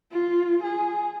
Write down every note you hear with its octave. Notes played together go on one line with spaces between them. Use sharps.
F4
G#4